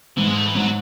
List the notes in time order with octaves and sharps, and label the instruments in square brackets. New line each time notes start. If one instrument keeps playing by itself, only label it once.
[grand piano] G#2 [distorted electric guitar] E3
[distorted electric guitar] G#3
A3
E3
[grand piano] G#2 [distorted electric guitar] F#3